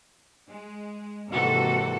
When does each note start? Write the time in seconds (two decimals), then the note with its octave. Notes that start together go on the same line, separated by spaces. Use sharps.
0.47 G#3
1.29 D#2 G#2 C3 E3 F#4 A4